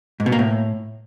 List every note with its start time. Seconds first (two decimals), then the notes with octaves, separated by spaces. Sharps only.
0.20 G#2
0.26 B2
0.32 A#3
0.39 A2